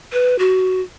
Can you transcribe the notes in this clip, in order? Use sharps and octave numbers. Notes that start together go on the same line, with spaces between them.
B4
F#4